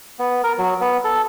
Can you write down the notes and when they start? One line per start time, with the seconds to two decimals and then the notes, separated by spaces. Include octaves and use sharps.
0.19 B3
0.44 A#4
0.58 F#3
0.81 B3
1.04 A4